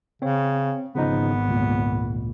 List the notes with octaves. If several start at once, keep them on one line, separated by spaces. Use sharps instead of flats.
C#3 C4 C#5
G#1 C#3 F3 B3 D#4
C#2 A#2